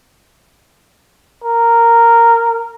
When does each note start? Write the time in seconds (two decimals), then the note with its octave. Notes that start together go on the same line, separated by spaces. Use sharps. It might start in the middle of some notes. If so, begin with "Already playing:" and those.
1.44 A#4